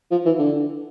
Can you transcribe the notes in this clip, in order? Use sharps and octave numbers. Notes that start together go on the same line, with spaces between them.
F3
E3
D3